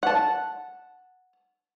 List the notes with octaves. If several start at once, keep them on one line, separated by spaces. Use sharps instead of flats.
F#5 A5